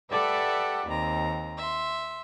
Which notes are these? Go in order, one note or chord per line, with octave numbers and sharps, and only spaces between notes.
G4 A4 B4 D5 E5 F#5
D#2 C4 A#5
E5 C6